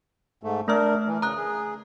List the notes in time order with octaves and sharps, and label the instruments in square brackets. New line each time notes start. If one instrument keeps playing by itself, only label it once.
[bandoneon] G#2 A3
[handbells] A3 E5 F6 [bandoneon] D4 A#4
[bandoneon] E3
[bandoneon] C#3 [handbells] A#5 D#6 F#6
[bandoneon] G#4